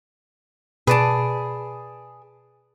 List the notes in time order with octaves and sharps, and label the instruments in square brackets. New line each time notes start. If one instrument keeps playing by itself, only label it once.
[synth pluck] B2 D7 [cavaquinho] G#4 [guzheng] B4 D5 A5